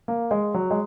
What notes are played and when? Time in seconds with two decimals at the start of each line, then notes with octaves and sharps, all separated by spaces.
0.08 A#3
0.31 G#3
0.54 F#3
0.71 G#3